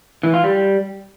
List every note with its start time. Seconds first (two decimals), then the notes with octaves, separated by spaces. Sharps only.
0.23 E3
0.34 F4
0.44 G3